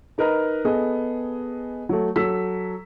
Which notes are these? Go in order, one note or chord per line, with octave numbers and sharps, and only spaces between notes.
D#4 A#4 B4 D#5 A#5
B3 G#4 A4 D#5
F#3 A3
F#3 A4 E6 B6